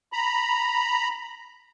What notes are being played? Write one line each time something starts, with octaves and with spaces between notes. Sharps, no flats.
A#5 B5